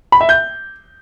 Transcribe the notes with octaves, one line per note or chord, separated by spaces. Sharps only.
B5
E5
G6